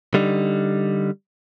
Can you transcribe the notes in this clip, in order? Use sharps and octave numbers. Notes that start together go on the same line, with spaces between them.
D3 G3 D#4